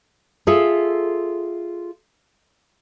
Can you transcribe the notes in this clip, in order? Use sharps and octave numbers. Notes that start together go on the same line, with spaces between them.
F4 G#4 A4 E5